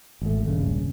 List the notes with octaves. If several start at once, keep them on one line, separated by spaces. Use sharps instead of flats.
G#1 A3
D#1 G2 C#3